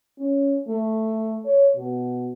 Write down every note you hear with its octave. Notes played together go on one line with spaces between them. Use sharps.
C#4
A3
C#5
B2